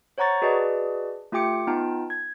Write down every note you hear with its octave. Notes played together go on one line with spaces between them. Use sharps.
C5 C#5 F#5 A#5 C#6 A6
F#4 G#4 B4 D5 D#5 A5
A3 F4 G4 G5 D6 C#7
B3 D#4 F4 G5 A5
G#6